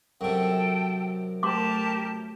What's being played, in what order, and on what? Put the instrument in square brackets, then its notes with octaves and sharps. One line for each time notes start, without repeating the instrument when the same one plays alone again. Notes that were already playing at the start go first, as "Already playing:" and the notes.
[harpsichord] F#2 C3 [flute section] A4 G5
[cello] A3 [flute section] G4 A#4 A5 [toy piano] C6 D6